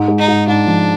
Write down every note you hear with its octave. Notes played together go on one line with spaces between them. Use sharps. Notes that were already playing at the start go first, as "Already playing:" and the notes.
Already playing: G#2
G#3
D#4
G#2
G#2 D4
F3